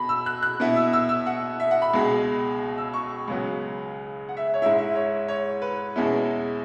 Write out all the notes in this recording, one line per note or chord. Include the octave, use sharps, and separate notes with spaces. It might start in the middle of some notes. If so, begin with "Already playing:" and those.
Already playing: B2 B5
E6
F#6
F#6
B2 B3 E4
E6
E6
E6
F#5
E5
F#5
B5
C#2 B2 G#3
E6
C#6
C#2 C#3 F#3 B3
F#5
E5
C#5
G#2 G#3 E4 E5
E5
C#5
C#5
B4
E2 B2 G#3 C#4 E4